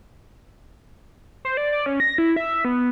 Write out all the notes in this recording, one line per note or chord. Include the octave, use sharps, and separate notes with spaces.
C5
D5
D5
C#4
A#6
E4
E5
B3